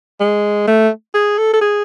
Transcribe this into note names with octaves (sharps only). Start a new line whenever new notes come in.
G#3
A3
G#4
A4
A4
G#4